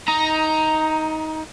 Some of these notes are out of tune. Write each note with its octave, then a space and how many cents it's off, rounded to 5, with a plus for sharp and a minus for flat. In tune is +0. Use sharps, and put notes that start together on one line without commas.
D#4 +15 A#5 +0